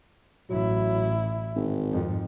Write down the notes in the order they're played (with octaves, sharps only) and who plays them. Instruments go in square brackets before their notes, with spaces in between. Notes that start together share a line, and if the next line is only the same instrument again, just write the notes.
[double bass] A1 E4 [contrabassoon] F#3
[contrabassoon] G#1
[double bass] F2 G#2